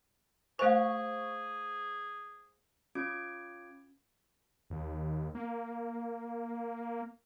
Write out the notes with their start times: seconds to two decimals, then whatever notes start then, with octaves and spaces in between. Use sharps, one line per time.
0.59 A3 G#4 C5 D#5 F5 G#5 C#6
2.95 C#4 F4 D6 G#6 D7
4.70 D#2
5.35 A#3